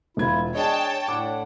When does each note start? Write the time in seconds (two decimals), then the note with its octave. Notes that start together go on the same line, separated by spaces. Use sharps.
0.17 E1 E4 F4 G#6
0.55 D4 G#4 C#5 D#5 G5 A5
1.08 A2 D4 F#5 D6